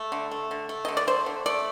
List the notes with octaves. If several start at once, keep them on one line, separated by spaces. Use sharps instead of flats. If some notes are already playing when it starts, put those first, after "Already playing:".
Already playing: A3
D3
A3
D3
A3
D3 D#5
D5
A3 C5
D3
A3 D5